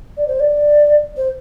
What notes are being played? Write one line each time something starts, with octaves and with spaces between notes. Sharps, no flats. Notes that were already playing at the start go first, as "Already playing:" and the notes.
D5
C5
D5
C5